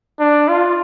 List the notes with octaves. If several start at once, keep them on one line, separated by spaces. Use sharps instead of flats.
D4
F4